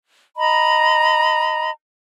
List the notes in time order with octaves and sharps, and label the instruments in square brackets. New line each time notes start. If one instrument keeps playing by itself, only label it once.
[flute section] D#5 A#5 B5